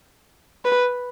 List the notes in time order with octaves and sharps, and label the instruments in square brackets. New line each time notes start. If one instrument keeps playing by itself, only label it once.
[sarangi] B4